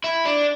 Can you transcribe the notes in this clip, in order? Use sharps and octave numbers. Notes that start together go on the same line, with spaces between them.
E4
D4